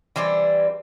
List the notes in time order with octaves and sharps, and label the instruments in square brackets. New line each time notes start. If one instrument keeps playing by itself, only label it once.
[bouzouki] E3 G3 C4 D4